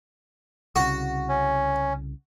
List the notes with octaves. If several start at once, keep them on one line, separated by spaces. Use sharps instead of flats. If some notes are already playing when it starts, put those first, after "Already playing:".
C2 C#3 F#4
C#4